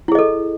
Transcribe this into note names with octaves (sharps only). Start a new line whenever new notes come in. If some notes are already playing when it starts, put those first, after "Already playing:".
E4 G#4 A4 D#5